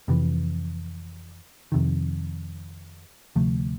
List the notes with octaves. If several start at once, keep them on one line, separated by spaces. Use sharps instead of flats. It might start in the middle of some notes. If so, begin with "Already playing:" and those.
F2 C3 E3
F2 C3 D#3
D2 C3 F3 A3